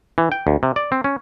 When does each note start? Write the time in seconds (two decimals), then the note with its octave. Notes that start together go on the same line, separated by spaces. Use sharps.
0.18 E3
0.32 G5
0.47 D2
0.63 C3
0.76 D5
0.92 C4
1.04 C#4